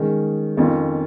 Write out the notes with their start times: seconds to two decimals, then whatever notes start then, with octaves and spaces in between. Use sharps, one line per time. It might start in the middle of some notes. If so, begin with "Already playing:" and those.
Already playing: D#3 G#3 C#4
0.57 F2 D#3 C#4 F4